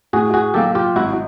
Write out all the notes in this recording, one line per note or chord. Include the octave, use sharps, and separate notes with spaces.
A2 F#4 G#4
F#4 G#4
F#3 A#3 G4 A4
F4 G4
G#1 E4 F#4